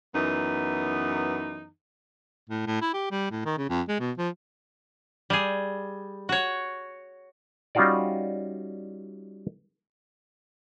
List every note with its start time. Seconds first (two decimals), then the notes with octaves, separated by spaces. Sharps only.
0.13 F#2 E3 B3 D#4
2.50 A2
2.67 A2
2.82 E4
2.94 G4
3.11 G3
3.31 A2
3.45 D#3
3.58 C#3
3.69 F2
3.88 G#3
4.00 B2
4.18 F3
5.30 G3 G#4
6.29 F#4 C#5
7.75 G3 C#4 D#4 F4 F#4 D5